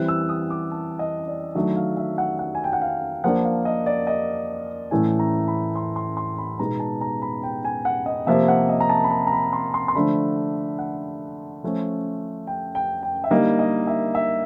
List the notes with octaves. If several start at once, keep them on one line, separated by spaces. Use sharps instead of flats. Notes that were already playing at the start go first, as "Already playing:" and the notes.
Already playing: E3 G3 C4 E4 F#6
E6
D#6
D6
A5
D#5
D5
D#3 F#3 A3 D4 E5
F5
E5
F#5
F#5
G#5
G5
F#5
F5
F3 A#3 D4 F#5
F5
D#5
D5
D#5
A2 E3 A3 C#4 E4 G#5
A#5
B5
C6
C6
C6
B5
B2 G#3 B3 D#4 A#5
A5
A#5
B5
G5
G#5
F#5
D#5
C3 F3 A#3 E5
F#5
D#5
A#5
A5
B5
A#5
A#5
B5
C6
C6
C6
D3 F3 A3 D4 B5
F#5
F3 A3 C#4
G5
G5
G5
E5
D3 G3 A#3 D#4 D#5
D#5
E5
E5